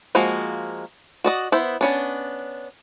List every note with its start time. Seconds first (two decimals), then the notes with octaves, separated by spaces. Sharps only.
0.15 F3 G#3 A#3 F#4
1.24 F#4 D5 D#5
1.52 B3 E4 C5
1.81 B3 C#4 D4